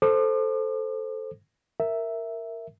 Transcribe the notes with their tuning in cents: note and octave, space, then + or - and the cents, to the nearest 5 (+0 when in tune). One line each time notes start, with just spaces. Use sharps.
A4 +0 C5 +0 D6 +45
A#4 -10 E5 +0